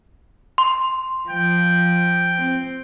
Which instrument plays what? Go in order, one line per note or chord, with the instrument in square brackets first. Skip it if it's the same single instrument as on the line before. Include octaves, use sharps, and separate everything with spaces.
[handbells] C6
[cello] F3 [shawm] G5
[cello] C4